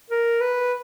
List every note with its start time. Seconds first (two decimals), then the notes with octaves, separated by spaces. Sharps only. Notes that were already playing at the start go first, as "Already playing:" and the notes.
0.10 A#4
0.41 B4